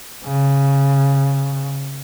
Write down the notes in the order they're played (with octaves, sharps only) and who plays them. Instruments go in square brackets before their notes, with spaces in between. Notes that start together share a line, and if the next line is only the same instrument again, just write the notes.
[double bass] C#3